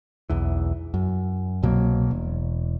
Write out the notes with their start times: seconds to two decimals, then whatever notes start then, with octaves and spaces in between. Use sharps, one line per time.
0.30 B1 E2 E3
0.94 F#2
1.63 C2 B2 F#3 A#3
2.11 E1